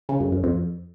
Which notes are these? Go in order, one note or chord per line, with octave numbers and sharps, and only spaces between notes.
C#3
F#2
F#2
F2